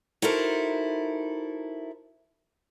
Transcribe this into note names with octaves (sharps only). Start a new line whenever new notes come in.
D#4 E4 F#4 A4 A#4 C5